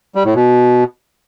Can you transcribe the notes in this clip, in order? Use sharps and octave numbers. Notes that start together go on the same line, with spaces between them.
G3
A2
B2